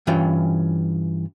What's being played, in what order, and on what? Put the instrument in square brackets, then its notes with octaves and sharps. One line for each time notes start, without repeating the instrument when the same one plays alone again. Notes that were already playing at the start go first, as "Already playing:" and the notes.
[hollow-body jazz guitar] G2 E3 C#4 F4 G5